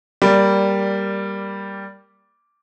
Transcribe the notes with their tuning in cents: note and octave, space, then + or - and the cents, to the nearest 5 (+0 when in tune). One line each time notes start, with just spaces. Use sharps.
G3 +0 A#3 +0 D5 -10